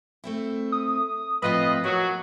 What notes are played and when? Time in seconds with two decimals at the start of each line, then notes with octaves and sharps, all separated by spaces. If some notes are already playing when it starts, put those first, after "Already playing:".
0.24 A3 C4 E4
0.72 D#6
1.42 A2 F3 C4 F4 B4 D#5 D#6
1.84 F3 F#3 A#3 F#4